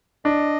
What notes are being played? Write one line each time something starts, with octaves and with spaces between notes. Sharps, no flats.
D4 D#5